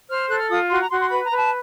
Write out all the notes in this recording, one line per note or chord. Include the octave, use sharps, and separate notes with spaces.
C5 F6
A4 F#6
F6
F4 D#6
F#4 C6
A#5
F#4 C6
C6
B4 B5
A#5
B4
A5